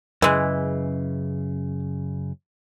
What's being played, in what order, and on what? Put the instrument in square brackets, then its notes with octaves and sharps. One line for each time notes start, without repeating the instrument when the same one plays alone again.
[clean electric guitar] F#2 C#3 [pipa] E3 G#3